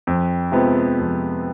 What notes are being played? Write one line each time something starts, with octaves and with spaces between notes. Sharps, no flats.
F2
C3 F3 G#3 B3
F2